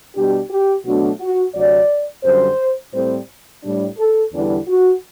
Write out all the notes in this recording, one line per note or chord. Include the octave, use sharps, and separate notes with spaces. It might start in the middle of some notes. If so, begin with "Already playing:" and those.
B2 G3 D4 G4
G4
B2 F#3 A3 D4 F#4
F#4
D2 C3 F#3 D5
F#2 D3 G3 C5
A2 G3 C4 C5
A2 G3 D4
A4
E2 D3 G3 B3 D4 E4
F#4